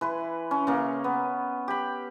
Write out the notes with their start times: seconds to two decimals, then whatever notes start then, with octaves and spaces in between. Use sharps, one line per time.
0.01 E3 B4 C6
0.51 C#4
0.67 C#3 A#3
1.04 B3
1.68 G4 B5